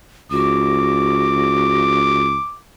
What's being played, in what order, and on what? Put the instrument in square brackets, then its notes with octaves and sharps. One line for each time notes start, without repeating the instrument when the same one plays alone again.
[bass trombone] C#2 [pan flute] F#4 [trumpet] D6